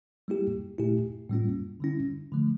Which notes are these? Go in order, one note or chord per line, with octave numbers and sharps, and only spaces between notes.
G3 A#3 E4 G4
A#2 A3 E4 G4
A2 G3 A#3 C#4 F4
D3 G3 C#4 E4
D3 F3 A3